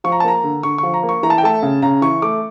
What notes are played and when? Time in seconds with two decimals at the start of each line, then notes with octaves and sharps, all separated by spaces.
0.04 F3 C#6
0.12 A#5
0.20 A5
0.24 A#3 A#5
0.44 D3
0.63 D3 C#6
0.78 F3 C#6
0.94 A#5
1.03 A#3
1.09 C#6
1.23 E3 A#5
1.30 A5
1.38 G5
1.43 A3 A5
1.63 C#3
1.82 C#3 A#5
2.02 E3 C#6
2.22 A3 D6